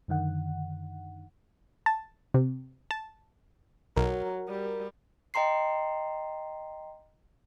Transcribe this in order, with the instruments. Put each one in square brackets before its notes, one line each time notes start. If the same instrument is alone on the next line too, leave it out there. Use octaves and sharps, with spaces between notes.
[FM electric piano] F#2 D3 D#3 F#5
[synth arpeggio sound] A5
C3
A5
[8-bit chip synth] B1 [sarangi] F#3 [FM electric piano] A#4
[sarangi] G3
[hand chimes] D#5 G5 A#5 C6 C7